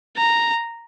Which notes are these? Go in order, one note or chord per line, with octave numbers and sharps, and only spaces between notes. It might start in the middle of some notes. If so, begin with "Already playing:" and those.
A#5